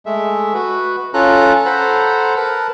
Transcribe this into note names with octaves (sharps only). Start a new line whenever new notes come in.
G#3 A3 E5
F#4 B4
C#4 F4 A4 A#5 F#6
A4 C5 F#5 A#5 B5
A#4 B4 A5